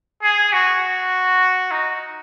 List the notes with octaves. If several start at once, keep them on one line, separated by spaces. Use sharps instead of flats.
G#4
F#4
D#4